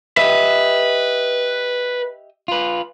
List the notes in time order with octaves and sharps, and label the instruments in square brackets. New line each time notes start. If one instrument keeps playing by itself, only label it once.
[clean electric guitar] G4 D#5 E5 [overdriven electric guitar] B4
[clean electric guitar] F4 B4